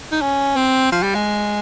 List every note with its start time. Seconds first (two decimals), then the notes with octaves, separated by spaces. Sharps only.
0.12 D#4
0.21 C#4
0.56 C4
0.92 F3
1.03 G3
1.15 G#3